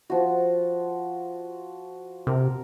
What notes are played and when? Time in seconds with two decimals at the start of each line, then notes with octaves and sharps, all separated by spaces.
0.10 F3 F#4
2.27 C3 A#4